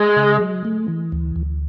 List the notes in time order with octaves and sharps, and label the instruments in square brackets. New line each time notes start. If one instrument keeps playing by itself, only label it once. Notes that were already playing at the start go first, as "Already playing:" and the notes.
Already playing: [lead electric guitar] G#3
[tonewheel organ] C#3
F#3
A3
E3
D2
D2